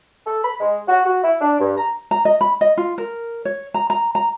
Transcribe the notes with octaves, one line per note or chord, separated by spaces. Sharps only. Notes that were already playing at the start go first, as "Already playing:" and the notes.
A4
B5
G#3
F#4
F#4
E4
D4
G2
A#5
A#5
D#5
B5
D#5
F4
A#4
C#5
A#5
A#5
A#5